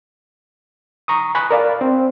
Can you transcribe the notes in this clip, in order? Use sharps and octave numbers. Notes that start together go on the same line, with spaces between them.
A#5 C#6 D#6
G#5 B5 C#6 F#6
A#4 D5 F5
C4